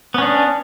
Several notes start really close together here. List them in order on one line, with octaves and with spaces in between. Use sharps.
B3 C#4 D4